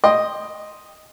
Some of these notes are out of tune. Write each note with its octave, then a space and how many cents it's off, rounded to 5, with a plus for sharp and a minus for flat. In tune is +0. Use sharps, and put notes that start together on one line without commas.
D#5 +0 G5 +15 C6 +0